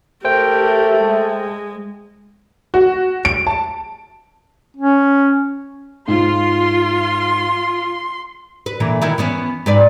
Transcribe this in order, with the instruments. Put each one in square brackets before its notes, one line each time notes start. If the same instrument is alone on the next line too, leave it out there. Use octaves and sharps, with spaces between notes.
[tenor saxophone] A3 [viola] G4 A#4 [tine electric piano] C5 G5
[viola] G#3
[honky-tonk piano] F#4
D7
A5
[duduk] C#4
[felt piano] G#2 [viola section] F4 [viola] C6
[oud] B4
A#2 D3 E3
D#3 B3 E4
E3 B3 C#4
G#2 B4 D5